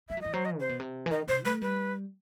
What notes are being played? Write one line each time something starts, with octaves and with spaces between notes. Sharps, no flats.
G3 E5
F#3
E3 D#5
F#3 C5
D#5
C3 C5
B2
C3
E3
D#3 D#5
C3 C5
A3 B4
G3 B4